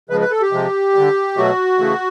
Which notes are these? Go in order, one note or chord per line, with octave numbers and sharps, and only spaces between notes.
C#3 F3 G#3 B4
B4
A4
G4
C3 F3 G#3
D3 G3
B2 F#3 A3 F#4
C#3 E3 A3